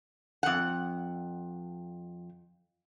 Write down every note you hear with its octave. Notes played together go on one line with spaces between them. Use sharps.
F2 F#5